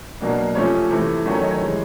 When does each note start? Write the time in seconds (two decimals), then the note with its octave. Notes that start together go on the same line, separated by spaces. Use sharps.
0.20 B2 F#3 A#3 D4
0.55 C3 F3 A3 C#4 C#5
0.90 C3 E3 A3
1.26 D#3 F#3 A3 C#4
1.34 C#5
1.43 D#5
1.51 C#5
1.60 C3 E3 G#3